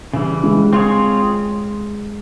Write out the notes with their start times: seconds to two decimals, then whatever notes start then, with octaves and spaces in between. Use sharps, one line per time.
0.13 C#3 E3 G3
0.44 G#3
0.73 C4 F4 G#4 C#5